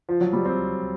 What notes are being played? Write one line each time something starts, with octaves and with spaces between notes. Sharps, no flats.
F3
F#3
G3
C4